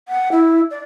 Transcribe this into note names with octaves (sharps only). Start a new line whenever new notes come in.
F#5
E4
D5